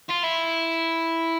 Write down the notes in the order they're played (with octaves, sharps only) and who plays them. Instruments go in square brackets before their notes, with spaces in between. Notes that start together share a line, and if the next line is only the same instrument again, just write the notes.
[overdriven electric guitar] F4
E4